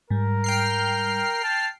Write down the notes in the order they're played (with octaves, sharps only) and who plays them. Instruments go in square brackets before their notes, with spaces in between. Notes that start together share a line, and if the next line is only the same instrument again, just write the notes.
[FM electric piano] G#2 G3 [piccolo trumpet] A#4
[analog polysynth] G5 F6 C7
[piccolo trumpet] A5